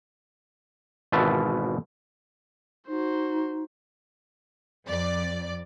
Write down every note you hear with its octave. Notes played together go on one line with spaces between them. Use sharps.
G#1 B2 E3 F4 E5 A5
D#4 F#4 C5
F2 D5